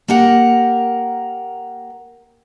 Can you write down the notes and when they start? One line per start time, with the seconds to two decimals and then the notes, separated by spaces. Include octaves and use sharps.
0.08 A#3 G4 A#4 F#5